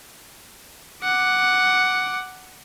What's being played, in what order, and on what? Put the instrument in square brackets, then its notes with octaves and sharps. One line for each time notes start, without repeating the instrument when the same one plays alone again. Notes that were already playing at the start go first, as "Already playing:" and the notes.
[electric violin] F#5 D6